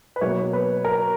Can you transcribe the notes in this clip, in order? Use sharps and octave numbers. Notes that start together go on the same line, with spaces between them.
B4
B2 F#3 A#3 C#5
B4
A#4